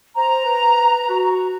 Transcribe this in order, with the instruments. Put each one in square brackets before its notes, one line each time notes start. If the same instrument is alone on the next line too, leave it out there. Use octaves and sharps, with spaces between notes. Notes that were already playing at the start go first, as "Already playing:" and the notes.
[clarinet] C5 [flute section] A#5
[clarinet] B4
F#4